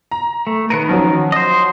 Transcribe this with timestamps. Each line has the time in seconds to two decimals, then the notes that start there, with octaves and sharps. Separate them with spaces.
0.11 A#5
0.47 A3
0.70 D#3 A#4 B4 C#7 D#7
0.89 F3 F#3 C#4
1.32 C5 D#5